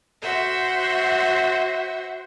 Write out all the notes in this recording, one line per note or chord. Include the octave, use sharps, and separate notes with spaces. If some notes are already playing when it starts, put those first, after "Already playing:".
F#4 C5 E5 F#5